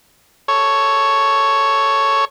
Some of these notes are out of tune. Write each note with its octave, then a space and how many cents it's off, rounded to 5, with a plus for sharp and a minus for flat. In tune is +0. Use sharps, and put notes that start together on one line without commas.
A4 +0 C#5 +0